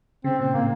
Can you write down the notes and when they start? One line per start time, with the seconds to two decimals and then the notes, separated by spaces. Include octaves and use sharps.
0.24 C#3 C4
0.39 A#2 C4
0.54 A2 A#3